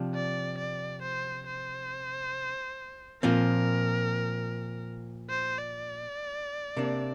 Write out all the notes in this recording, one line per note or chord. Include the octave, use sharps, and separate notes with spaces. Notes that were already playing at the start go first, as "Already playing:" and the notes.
Already playing: C3 F3 D4
D5
D5
C5
C5
A#2 F3 C4 A#4
C5
D5
C3 A#3 D4